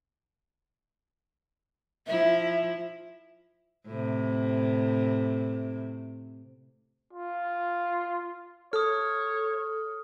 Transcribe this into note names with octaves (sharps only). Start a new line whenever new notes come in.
F3 E4 E5
A2 C3
F4
A4 C#5 D#6 F6